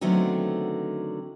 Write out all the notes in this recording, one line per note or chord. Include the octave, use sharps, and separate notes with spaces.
D3 D#3 F#3 A3 B3 C4